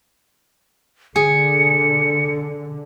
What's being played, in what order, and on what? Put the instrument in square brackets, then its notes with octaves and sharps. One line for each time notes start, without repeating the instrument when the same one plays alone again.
[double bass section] D3 [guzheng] G#4 [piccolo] C#7